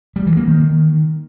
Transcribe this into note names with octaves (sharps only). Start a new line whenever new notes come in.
G3
E3
A#3
D#3